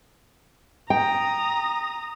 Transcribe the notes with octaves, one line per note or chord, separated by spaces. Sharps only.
G5 A#5 D#6